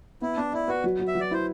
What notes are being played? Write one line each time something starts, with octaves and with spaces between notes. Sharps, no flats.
B3 E4
B3 D4
E4 D5
F#4 B4
F#3
F#3
E5
F#3
D5
E4 C5